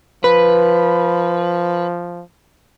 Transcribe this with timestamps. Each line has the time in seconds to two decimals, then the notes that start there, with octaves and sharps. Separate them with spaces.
0.24 F3 B4